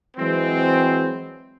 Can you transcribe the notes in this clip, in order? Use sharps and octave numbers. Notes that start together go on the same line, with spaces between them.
E3 F#3 G#3 C4